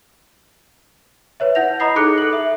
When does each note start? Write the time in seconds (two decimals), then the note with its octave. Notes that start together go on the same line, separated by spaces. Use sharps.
1.40 B4 C#5 E5
1.55 E4 F#5 G6 A#6 F7
1.80 D#5 A#5 B5 D#6 A#6 C7
1.96 D#4 G#4 A4 D6 F#6 C#7
2.18 A4 F#7
2.33 E5